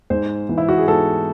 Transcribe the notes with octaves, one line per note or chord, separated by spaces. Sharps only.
G#2 C5
E3
E4
F#4
G#4
G#2 A4